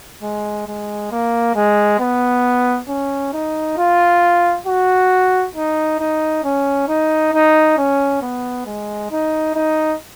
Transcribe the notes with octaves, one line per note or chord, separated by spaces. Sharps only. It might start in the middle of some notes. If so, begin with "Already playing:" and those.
G#3
G#3
A#3
G#3
B3
C#4
D#4
F4
F#4
D#4
D#4
C#4
D#4
D#4
C#4
B3
G#3
D#4
D#4